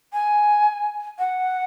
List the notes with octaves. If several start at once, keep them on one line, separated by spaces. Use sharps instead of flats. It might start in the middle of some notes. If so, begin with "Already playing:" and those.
G#5
F#5